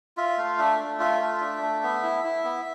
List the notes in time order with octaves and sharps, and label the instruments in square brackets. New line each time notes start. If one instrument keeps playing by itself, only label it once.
[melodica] F4 E5
A3 F5
D4 E5
A3
F4 E5
A3
D4
A3
B3
E4
E4
B3